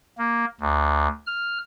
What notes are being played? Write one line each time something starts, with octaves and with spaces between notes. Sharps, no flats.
A#3
D2
F6